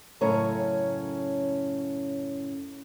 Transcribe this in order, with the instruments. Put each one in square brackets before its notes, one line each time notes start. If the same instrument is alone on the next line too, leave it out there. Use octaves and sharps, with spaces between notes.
[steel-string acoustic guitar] F#2 A2 C#3 C#4 C#5 A#5